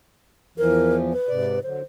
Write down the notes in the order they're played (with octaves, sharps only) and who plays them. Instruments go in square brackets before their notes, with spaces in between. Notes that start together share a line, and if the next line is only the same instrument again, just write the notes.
[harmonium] E2 E3 F3 [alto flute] A#4
[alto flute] B4
[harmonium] G#2 C3 D5
[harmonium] D3 F#3 [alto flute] C5